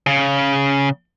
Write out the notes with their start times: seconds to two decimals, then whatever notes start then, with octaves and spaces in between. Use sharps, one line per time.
0.07 C#3